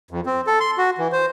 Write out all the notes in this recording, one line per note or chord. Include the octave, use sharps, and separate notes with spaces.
F2
C4
A4
C6
F#4
E3
C5